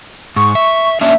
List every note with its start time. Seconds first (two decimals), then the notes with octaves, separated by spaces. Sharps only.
0.36 G#2 C#6
0.55 E5
1.01 A#3 C#4 D4 E5